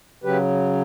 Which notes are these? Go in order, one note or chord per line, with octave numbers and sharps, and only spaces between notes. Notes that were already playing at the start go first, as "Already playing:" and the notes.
C#3 F#3 G4 B4